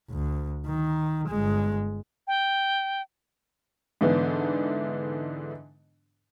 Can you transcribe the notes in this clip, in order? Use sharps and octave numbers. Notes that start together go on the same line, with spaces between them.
D2
D#3
G1 G#3
G5
G#2 D3 E3 B3 D4